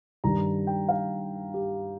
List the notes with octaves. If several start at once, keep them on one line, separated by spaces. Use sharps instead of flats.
G2 D#3 G3 A#5
G5
F5
G4